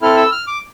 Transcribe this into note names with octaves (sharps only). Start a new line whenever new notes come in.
C4 E4 A4 F6
E6
F6
D6